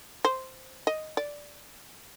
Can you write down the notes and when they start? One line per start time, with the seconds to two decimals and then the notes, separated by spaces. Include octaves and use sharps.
0.25 C5
0.87 D#5
1.17 D5